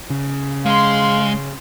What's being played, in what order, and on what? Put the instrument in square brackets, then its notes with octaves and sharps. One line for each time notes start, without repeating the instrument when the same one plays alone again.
[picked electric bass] C#3
[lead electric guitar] G#3 [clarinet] F5 [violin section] C6